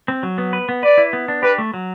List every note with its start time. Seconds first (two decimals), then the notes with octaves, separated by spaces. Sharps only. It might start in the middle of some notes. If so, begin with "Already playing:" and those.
0.08 C4
0.23 F#3
0.38 B3
0.53 B4
0.69 B3
0.83 B4 D5
0.98 E4
1.13 B3
1.28 D4
1.43 G4 B4
1.58 A3
1.74 F#3